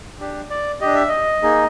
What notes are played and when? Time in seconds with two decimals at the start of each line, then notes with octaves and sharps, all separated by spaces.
0.20 D4 G4
0.50 D5
0.81 D4 G4 D#5
0.95 E5
1.08 D#5
1.43 A#3 D#4 G#4